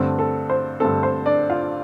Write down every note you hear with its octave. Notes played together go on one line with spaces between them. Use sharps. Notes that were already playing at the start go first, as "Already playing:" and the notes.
Already playing: G2 D3 A3 C4
A4
C5
G2 D3 A3 C4 A4
C5
D4 D5
F4 F5